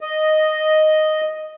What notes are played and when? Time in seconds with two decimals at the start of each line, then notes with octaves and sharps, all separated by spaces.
0.01 D#5